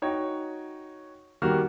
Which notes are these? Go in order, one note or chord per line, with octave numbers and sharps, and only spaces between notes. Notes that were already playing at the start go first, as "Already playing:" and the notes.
D#4 F#4 C#5 G5
D#3 G3 A#3 F#4 F6